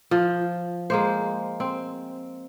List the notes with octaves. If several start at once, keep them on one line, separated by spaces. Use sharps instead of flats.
F3
G#3 A#3 C5
C4